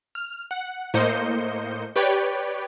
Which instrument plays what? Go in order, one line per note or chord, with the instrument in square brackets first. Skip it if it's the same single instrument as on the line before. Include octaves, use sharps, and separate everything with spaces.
[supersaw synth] F6
F#5
A2 A#3 C5 D#5 G6 C#7
G4 B4 C#5 D5 G5